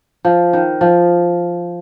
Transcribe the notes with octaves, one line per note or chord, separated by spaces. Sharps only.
F3
D#3
F3